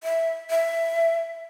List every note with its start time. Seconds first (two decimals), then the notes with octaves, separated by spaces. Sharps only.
0.04 E5
0.50 E5